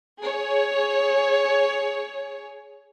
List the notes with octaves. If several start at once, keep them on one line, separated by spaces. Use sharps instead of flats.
G#4 C#5